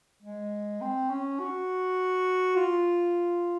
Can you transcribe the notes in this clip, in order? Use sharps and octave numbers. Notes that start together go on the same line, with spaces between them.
G#3
C4
C#4
F#4
F4